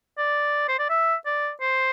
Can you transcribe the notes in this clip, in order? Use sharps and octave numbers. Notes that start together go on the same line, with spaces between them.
D5
C5
D5
E5
D5
C5